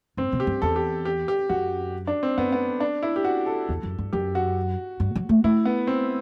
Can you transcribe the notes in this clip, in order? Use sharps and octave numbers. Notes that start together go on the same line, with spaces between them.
G2 C4
B2
G4
G2
E2 A4
G4
G4
G4
F#2 F#4
D4
C4
F#2 B3
B3
D4
E4
G4
F#4
A4
E2
F#2
G2
F#2 G4
F#4
G2
F#3
A3
A3 E4
B3
C4